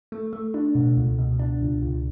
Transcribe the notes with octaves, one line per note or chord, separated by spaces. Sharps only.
A3
A3
D4
B2
C#2
B2
D4
C#2
C#2